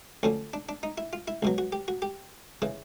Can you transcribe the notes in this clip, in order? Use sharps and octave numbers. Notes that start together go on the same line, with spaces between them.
D2 D3 F3 C#4
D4
D4
D#4
E4
F4
E4
C#2 B2 F#3
F#4
G4
F#4
G4
C#3 E3